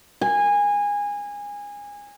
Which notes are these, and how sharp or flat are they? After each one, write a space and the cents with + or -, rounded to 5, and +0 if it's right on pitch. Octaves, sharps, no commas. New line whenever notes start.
G#5 -20